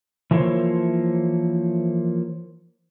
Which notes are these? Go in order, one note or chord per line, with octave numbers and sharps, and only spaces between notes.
E3 F3 A#3 E4 C5 C#5